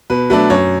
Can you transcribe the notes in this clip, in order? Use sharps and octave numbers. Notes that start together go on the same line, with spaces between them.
B2 B4
F#3 A3 D4 B4
F#2 C#5